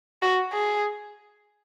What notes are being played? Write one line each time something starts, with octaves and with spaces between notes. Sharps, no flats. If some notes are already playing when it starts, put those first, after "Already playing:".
F#4
G#4